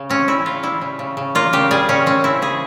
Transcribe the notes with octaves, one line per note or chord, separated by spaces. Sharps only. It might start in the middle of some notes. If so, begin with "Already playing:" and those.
Already playing: C#3
C4 C#4
C4 E4
C#3 F4
G3 E4
C#3
C#3
C#3
A#3 F4
C#3 G4
G3 G#4
C#3 C#4
C4 C#4
C4 E4
C#3 G#4